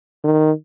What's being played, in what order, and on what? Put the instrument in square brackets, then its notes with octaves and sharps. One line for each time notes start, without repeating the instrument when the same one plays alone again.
[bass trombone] D#3